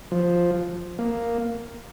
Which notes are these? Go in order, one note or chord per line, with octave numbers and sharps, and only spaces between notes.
F3
A#3